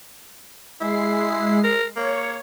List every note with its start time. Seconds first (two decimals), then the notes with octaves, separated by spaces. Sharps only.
0.81 G#3 E4 C7
1.64 A#4
1.96 A#3 C#5